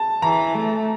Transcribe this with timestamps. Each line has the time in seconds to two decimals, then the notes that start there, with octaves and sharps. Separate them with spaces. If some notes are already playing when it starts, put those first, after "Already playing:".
Already playing: A5
0.22 E3 A#5
0.54 A3